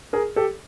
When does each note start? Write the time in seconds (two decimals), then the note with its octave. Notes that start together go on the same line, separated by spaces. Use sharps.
0.13 G#4 A#4
0.36 G4 A4